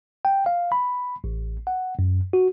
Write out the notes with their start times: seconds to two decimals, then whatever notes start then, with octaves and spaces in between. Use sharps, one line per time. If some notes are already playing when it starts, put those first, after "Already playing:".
0.25 G5
0.46 F5
0.72 B5
1.24 A1
1.67 F#5
1.99 F#2
2.33 F#4